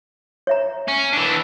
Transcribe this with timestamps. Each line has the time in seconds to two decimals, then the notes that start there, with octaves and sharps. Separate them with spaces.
0.47 C#5 E5 A#5
0.88 C#4
1.13 E3 D4